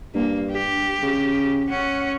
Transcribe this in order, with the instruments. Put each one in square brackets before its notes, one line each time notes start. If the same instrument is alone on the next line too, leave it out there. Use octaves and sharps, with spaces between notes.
[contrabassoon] G2 [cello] A#3
[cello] G4
[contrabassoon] C#3
[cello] C#4 F#5